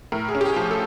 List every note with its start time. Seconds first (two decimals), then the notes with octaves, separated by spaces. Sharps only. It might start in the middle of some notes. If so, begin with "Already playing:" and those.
0.12 A2 A#4
0.29 G#4
0.35 C#4
0.41 G4
0.46 G#4
0.56 F3
0.71 A4